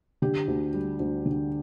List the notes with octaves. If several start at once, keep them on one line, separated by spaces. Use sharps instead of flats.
D3 G4
D2
G3
D2
D3